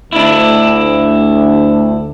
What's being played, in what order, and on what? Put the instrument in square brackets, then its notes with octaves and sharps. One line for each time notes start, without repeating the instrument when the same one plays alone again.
[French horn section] D2 [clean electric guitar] D4 E4